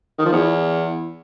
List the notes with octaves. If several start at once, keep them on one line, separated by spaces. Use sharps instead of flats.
D#3
F3
E2